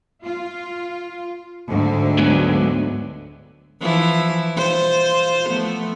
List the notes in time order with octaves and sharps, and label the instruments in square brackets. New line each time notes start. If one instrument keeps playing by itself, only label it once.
[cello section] F4
D2 G#2 D3
[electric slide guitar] F#3 G#3 B3
[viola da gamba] E3 F3 E4
F4 C5
F3 A3 B3